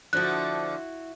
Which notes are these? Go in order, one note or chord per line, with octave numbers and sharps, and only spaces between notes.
D3 F3 E4 F#4 F#6